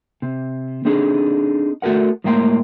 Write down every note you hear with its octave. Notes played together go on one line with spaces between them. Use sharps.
C3
C4 D4 D#4 G#4 A4
A3 F#4 A4 A#4 F#5
A2 G#3 A#3 A#4 G5 C6